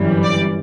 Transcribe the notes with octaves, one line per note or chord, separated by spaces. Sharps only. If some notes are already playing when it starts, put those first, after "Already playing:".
Already playing: G1 F#2 E3 G3
D5